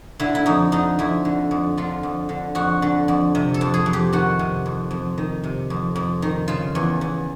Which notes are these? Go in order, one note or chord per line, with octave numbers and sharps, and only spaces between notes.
D3 E4
E4
F2 D#4
D3 D#4
F2 E4
D3
F2
D3 F4
F2
D3
F2 F#4
D3
F2
C3
A4
F2
G#4
F2
G4
D#3 F#4
C3
F2
F2
D#3
C3
F2
F2
D#3
C#3 F4
E2
E2